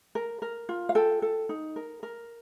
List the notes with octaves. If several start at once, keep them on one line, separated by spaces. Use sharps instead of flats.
A#4
A#4
F4
F5
A4 G5
A4
D#4
A#4
A#4